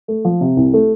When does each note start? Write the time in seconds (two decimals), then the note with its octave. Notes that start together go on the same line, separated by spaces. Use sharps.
0.08 A3
0.25 F3
0.41 C3
0.57 C2
0.74 A3